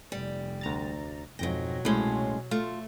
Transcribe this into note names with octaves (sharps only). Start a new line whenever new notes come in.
F1 G3
D2 A#5 A6
F2 G#2 B2 F#3 G5 A#6
C2 A2 G#3 C#4 C6
A3 F4